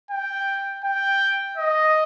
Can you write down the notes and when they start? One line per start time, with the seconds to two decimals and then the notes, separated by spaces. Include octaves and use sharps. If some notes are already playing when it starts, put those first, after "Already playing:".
0.11 G5
0.84 G5
1.57 D#5